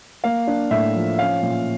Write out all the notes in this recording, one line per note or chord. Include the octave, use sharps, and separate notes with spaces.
A#3 F5
D4
A2 E5
F3
C#4 F5
A#2